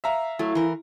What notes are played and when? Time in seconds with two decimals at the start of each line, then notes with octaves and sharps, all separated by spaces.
0.04 E5 F5 A#5
0.39 F#3 A3 E4
0.55 E3 A#4